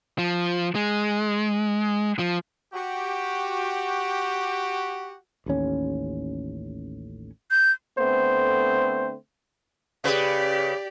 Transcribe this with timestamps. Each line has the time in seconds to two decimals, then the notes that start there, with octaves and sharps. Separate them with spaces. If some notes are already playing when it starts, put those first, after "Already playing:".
0.18 F3
0.75 G#3
2.19 F3
2.74 F#4 G4
5.46 A1 D#2 C#4
7.51 G6
7.98 D3 A3 B3 C4 C5
10.04 C#3 G4 B4 D5